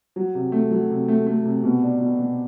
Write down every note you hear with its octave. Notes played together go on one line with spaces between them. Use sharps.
F#3
C3
A3
F#3
C3
A3
A3
C3
B2
D4
B2
B2